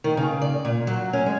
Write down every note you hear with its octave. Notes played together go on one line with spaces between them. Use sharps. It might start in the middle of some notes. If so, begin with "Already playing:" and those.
D#3
C#3
D5
A#2
F#3
C#4
G#3